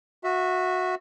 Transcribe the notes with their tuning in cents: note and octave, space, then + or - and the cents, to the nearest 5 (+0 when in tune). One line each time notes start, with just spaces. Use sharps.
F#4 -15 E5 +0